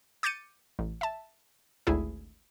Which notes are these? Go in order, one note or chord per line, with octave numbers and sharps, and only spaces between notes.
D6 G6 A6 C#7 D#7
A1
E5 A5
G#1 D2 E4 G#4